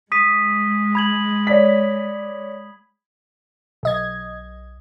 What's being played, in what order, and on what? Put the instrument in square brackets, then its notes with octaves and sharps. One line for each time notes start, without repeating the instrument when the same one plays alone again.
[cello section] G#3 [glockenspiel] D#6 B6 D#7
[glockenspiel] B5 G#6 F#7
[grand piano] C#5 D5 B6
[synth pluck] B1 D#5 G#6